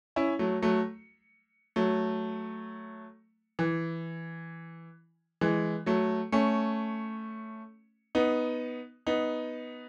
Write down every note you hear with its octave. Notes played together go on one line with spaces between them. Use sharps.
C#4 E4
F#3 A3
F#3 A3
F#3 A3
E3
E3 G#3
F#3 A3
A3 C#4
B3 D#4
B3 D#4